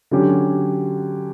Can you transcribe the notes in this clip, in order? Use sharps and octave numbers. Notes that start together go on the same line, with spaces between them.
D3 F#3 C#4 G4